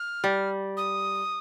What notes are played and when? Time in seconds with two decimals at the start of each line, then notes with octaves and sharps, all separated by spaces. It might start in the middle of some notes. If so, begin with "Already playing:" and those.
Already playing: F6
0.24 G3
0.77 D#6